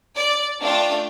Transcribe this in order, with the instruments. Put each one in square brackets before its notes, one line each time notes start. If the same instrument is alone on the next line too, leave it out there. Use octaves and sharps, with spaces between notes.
[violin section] D5
A3 D4 F4 G5